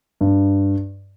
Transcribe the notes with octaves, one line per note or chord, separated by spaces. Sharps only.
G2